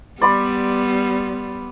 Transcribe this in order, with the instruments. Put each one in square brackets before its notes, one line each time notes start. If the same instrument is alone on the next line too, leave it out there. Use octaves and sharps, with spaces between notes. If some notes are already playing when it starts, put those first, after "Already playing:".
[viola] G3 [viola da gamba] B3 [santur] D5 B5 C6